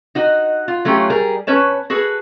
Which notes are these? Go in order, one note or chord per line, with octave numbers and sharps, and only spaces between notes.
D#4 F#4 D#5
F4
F#3 A3 C#4 F4 G4
G3 G#4 A#4
C#4 B4 C#5 A5
F#4 G#4 A4 B4